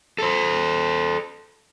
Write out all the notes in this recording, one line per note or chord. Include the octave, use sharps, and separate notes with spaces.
A4 C5